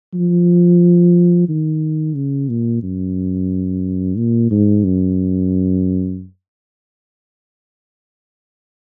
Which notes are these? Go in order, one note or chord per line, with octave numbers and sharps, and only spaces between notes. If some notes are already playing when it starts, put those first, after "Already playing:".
F3
D#3
C#3
A#2
F#2
A#2
G#2
F#2